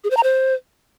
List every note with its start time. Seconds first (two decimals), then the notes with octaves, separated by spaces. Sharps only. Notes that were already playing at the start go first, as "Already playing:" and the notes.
0.04 G#4
0.10 C5
0.17 A#5
0.23 C5